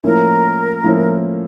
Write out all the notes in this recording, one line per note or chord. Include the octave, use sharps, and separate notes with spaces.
A2 F3 A#3 C#4 E4 A#4
A2 F3 A#3 C#4 E4